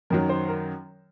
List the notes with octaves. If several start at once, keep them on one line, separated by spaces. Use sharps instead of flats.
F#2 D#3 F#3 A#4
C5
A#4